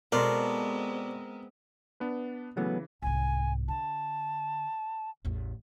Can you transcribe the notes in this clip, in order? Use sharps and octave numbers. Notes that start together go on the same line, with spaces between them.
B2 G#3 B3 C4 A4 A#4 C5 D5
B3 D4 B4
C#3 E3 F#3 A3 B3
C2 G#2 G#5
D3 A5
A1 E2